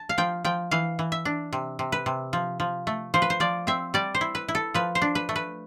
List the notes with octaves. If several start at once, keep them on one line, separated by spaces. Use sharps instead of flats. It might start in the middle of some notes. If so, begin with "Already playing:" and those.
Already playing: A5
F5
F3 G5
F3 G5
E3 F5
E3
E5
D4
C3
C3
B4
C3
F3
F3
A3
F3 C5
B4
C5
F3 D5
C4 E5
G3 D5
C5
E4
B4
E4
A4
F3 B4
C5
D4
B4
A3
B4